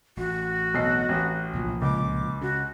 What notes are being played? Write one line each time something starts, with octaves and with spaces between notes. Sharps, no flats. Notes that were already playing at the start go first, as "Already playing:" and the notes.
A1 F#4
B1 D#5 C7
A1
C2 A#2 F3
C#2 D6
C#3 F#4